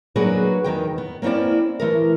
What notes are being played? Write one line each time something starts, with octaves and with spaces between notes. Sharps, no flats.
F#3 A#3 D4 F#4 G#4 B4
E2 D#3 G5
B3
A#3 C4 C#4 E4 D5
E3 A3 A#4